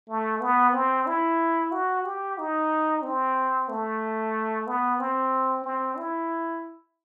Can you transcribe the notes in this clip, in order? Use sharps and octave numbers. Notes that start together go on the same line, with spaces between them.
A3
B3
C4
E4
F#4
G4
D#4
C4
A3
B3
C4
C4
E4